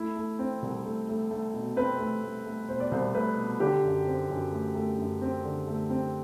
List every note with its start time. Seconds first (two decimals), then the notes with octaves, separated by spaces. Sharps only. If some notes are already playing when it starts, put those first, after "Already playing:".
Already playing: A3 E4
0.16 A3
0.39 C4
0.62 C2
0.85 A3
1.09 A3
1.31 A3
1.54 B2
1.77 C4 B4
1.99 A3
2.23 A3
2.46 A3
2.68 B2 C5
2.80 D5
2.91 C2 C5
3.14 A3 B4
3.37 B2
3.60 D3 G4
3.84 F#2
4.07 C4
4.30 F#2
4.52 A3
4.75 A3
4.98 F#2
5.21 C4
5.45 D3
5.67 A3
5.90 C4